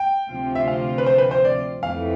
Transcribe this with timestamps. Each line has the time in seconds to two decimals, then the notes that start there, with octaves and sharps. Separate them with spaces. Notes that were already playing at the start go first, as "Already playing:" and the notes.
Already playing: G5
0.29 D2 C3 F3 C4 F4
0.55 E5
0.68 F5
0.98 B4
1.06 C5
1.18 B4
1.31 C5
1.45 D5
1.83 F2 E3 A3 F5